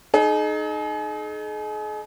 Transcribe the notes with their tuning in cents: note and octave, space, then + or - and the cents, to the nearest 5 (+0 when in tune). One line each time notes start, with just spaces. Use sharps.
D#4 -15 G#4 +40